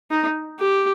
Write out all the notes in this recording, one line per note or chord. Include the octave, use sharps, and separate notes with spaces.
D#4
G4